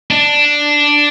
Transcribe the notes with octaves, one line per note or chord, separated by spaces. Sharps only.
D4